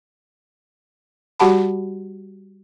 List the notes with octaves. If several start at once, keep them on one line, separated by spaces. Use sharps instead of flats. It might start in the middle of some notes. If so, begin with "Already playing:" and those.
G3 F#4 G4 F#5 A5 B5